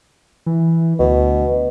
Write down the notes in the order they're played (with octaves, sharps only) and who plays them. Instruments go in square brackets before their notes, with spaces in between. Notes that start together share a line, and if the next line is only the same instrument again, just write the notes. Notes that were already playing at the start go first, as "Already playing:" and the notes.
[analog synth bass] E3
[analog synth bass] D2 [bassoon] B2